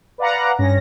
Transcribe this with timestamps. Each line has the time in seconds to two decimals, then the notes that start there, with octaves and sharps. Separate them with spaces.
0.18 B4 D5 F5 F#5 A#5
0.59 G2 C#4 A#6